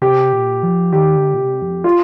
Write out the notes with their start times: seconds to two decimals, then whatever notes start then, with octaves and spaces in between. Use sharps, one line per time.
0.02 C3 G4
0.33 A#2
0.63 F3
0.93 D#3 G4
1.16 D3
1.34 A#2
1.39 C3
1.62 F2
1.84 F4